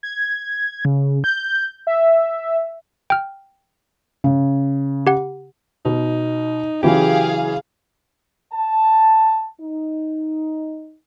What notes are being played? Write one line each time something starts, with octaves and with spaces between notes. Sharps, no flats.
G#6
C#3
G6
E5
G5 F6
C#3
G4 F#5
B2 D#4
C#3 E3 F#3 G4 G#4 F5
A5
D#4